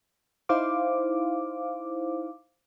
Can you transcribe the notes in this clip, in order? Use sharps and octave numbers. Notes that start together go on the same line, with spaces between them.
D#4 E4 C5 F5 D6